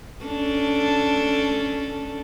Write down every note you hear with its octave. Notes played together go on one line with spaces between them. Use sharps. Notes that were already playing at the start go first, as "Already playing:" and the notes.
C#4 D4 A4